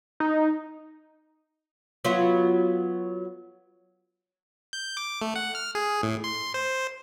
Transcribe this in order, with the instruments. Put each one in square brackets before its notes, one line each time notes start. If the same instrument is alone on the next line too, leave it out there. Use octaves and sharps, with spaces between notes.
[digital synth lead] D#4
[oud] F#3 B3 F4
[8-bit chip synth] G6
D6
A3
F#5
F6
G#4
A2
C6
C5